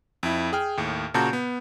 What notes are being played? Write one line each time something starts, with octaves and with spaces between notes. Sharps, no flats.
F2 E4
G#4 G5 F6
D#2 A2
A#2 C#3 F#4 A5 A#5 G6
B3